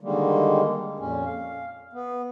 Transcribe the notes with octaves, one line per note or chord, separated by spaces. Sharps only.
D3 D#3 G3 G#3 A#3
F2 A#2 C#4
F5
B3